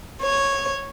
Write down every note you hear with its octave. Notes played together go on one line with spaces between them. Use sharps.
C#5